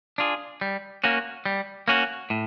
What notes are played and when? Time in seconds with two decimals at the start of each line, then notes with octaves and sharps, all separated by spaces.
0.18 D4 F4 G#4
0.61 G3
1.04 A#3 C#4 F#4
1.46 G3
1.88 A#3 C#4 F#4
2.30 A2